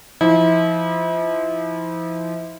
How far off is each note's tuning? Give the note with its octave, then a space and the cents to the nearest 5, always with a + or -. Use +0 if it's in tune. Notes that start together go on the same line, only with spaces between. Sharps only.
F3 -30 E4 -35